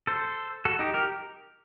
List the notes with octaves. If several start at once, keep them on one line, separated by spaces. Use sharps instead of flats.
A4 C5
F#4 A4
D#4 G4
G4 A#4